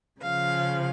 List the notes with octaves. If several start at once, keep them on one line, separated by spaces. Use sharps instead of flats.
C#3 F3 F5